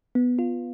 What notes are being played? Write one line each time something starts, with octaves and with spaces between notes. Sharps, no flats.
B3
F4